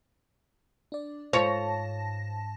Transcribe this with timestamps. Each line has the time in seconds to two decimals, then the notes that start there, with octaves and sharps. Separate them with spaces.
0.92 D4 D5
1.33 G#2 F3 C#5 A5 A#6